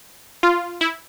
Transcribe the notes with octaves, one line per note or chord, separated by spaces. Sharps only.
F4
E4